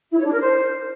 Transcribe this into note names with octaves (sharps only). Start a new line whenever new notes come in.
E4
C#5
D4
A#4
C5